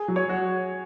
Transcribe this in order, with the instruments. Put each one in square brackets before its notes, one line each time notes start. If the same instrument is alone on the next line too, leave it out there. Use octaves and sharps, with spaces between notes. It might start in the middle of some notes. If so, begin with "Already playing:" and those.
Already playing: [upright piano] G#4
[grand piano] F#3
[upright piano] C#5
[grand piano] F#4